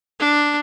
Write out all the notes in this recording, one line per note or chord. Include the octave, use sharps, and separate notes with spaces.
D4